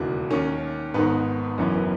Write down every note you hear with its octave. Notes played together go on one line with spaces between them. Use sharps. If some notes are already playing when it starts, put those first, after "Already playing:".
Already playing: E1 D#2 C#3 E3 F#4
D#2 D#3 C#4
G#1 G#2 D#3 B3
F#1 F#2 E3 C#4
B3